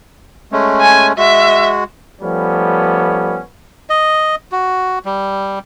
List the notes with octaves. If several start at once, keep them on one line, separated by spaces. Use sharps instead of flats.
G#3 A3 C#4
G#5
G#3 F#4 E5
F3 G3 A3 B3 C#4
D#5
F#4
G3